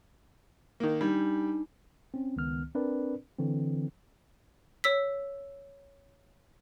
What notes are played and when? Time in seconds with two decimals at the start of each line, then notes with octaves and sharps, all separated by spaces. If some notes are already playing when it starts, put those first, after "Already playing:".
0.80 D#3 A#3
1.01 G3 D4 D#4
2.14 C4 C#4
2.36 C#2 D#3 B3 F6
2.75 C4 D4 A#4 B4 D5
3.39 D3 E3 C4
4.84 C#5 E6 B6